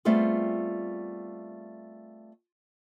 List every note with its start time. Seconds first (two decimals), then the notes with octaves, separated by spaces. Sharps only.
0.05 G3 A3 B3 C4 F4 G#4